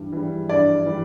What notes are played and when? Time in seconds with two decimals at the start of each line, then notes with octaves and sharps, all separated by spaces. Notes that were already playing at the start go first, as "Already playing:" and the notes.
Already playing: G2 E3 G3
0.12 E3 G3
0.49 G2 D5
0.86 E3 G3